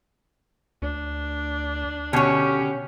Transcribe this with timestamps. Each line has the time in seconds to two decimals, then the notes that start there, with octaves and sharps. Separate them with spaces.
0.82 D2 D4
2.13 B2 D3 C#4 G4 C#5